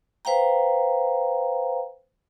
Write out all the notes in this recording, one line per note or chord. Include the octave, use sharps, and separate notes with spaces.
B4 C5 F5 G5 A#5